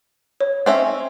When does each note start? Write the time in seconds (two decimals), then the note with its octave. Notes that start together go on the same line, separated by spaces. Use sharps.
0.41 C#5
0.66 C4 C#4 E5